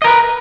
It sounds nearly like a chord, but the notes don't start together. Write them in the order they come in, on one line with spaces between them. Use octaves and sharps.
D#5 A#4 B4